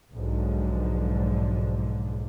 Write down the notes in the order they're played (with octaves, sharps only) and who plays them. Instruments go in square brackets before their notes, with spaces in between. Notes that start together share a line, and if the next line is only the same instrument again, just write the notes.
[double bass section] B1 G#2 D3 F3